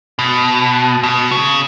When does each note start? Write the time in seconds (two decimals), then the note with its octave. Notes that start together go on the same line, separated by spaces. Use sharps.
0.19 B2
1.03 B2
1.31 C#3